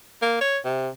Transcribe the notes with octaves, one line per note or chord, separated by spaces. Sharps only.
A#3
C#5
C3